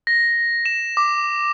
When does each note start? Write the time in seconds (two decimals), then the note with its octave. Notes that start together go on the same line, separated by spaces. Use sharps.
0.07 A#6
0.66 E7
0.97 D6